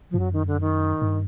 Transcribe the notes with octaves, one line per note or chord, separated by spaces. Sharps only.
F3
G2
F#2 F#3
D#3
D3
D#3
G2